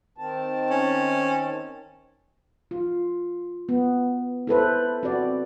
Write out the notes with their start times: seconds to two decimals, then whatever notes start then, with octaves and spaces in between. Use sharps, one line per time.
0.18 D#3 C4 A5
0.70 C#4
2.71 F4
3.69 B3
4.47 E4 A4 B4 C5
5.03 C4 F#4 D5